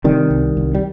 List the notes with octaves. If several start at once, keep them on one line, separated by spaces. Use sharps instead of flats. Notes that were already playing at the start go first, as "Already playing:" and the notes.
C3 D#3 G3
C2
C2
G3